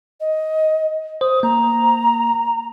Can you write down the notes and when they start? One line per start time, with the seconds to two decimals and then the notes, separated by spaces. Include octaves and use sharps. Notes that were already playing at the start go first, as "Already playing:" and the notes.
0.20 D#5
1.21 C5 D#6
1.43 A#3 A#5